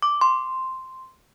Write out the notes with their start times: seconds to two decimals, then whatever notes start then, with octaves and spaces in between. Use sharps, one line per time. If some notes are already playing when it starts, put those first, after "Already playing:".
0.02 D6
0.21 C6